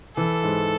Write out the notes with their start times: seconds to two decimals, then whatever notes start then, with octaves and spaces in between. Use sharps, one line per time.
0.16 E3 A4
0.43 G#2